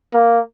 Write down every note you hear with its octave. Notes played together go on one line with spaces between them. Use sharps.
A#3